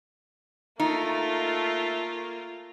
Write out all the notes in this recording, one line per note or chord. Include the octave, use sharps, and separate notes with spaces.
A3 A#3 D#4 F4